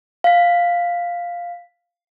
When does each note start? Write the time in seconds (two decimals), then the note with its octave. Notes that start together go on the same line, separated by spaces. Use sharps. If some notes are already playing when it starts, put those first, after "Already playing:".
0.24 F5 B6